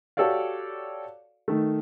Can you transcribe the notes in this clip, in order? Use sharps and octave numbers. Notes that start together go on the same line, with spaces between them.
F#4 G4 A4 C#5 D5 F5
D#3 A3